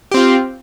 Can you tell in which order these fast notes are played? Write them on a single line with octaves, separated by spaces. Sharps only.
G4 C4 F4